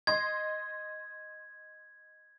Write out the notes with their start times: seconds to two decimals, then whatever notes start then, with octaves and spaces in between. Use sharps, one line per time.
0.07 D#5 C6 G#6